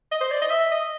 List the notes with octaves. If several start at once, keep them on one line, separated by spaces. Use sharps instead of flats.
D#5
C5
D5
D#5
E5
D#5